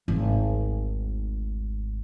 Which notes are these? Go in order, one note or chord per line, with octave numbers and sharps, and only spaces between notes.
G#1 D2